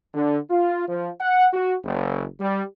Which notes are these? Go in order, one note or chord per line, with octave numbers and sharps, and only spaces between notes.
D3
F4
F3
F#5
F#4
F#1
G3